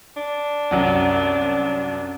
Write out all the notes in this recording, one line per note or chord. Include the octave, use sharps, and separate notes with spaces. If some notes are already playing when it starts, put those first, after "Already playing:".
D4
C2 F#2 F#3